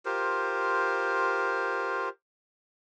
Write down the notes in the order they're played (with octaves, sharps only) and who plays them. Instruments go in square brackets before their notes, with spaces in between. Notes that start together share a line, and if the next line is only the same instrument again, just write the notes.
[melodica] F4 G4 A#4 C5